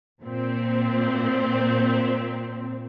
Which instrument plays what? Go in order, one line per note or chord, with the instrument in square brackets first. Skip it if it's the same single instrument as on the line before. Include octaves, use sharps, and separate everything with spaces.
[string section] A#2 C4